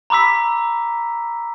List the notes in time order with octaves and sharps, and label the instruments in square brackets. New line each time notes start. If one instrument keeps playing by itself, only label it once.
[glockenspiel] A#5 B5 D6 E6 B6